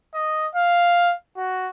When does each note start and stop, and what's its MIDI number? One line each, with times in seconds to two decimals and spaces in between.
0.14 0.47 75
0.55 1.13 77
1.37 1.70 66